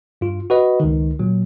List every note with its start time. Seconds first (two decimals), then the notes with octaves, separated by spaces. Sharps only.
0.21 G2 F4
0.50 F#4 B4 D#5
0.80 C#2 D#3
1.19 A#2 F#3